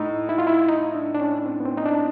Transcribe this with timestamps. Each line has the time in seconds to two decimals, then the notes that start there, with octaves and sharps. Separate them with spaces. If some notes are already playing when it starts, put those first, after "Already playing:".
Already playing: A2 D#4
0.29 E4
0.38 F4
0.47 E4
0.69 D#4
0.95 D4
1.15 D4
1.20 C#4
1.46 C4
1.60 B3
1.66 C4
1.77 D#4
1.85 D4